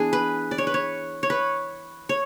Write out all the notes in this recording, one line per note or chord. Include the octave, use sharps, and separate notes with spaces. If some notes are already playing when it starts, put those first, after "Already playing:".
Already playing: E3 B3 D4 G#4
B4
D5
C#5
B4
C#5
C#5
B4
C#5